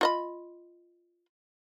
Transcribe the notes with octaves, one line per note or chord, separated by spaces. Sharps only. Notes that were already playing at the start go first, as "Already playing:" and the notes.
F4 D#5 B5